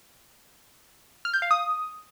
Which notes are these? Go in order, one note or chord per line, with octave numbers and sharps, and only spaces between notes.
F6
G6
F5
D#6